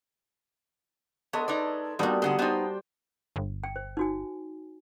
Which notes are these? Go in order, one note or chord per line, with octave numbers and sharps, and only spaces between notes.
G#3 B3 A4 C#5
D#4 B4 D5
G3 A#3 B3 D4 D#4 F#4
G#2 D3 G#4 F#5 C6
B3 D#4 C5 G5 A5 C6
G1
G5
C5
D#4 F#4 G#5